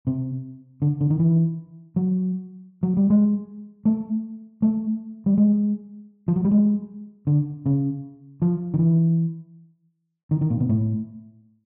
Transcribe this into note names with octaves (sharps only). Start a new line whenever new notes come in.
C3
D3
D3
D#3
E3
F#3
F#3
G3
G#3
A3
A3
G3
G#3
F3
F#3
G3
G#3
D3
C#3
F3
D#3
E3
D#3
D#3
A#2
B2
A2